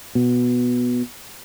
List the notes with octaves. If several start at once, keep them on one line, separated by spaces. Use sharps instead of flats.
B2